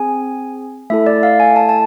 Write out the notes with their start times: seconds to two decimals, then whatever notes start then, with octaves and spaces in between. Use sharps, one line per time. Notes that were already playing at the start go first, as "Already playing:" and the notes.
Already playing: C4 G#4 G#5
0.90 A3 E4 A4 E5
1.07 D5
1.23 F5
1.40 G#5
1.56 A5
1.69 A5